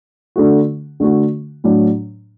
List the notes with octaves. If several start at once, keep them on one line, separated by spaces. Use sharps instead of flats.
D3 A3 F#4
D3 A3 F#4
A2 F#3 D4